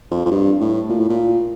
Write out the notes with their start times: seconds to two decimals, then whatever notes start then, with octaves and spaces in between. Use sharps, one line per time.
0.11 F2
0.25 F2
0.31 G2
0.60 A2
0.89 A#2
1.00 A2
1.10 A#2